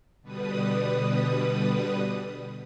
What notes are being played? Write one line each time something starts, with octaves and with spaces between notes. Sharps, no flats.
B2 D3 G3 B4 D#6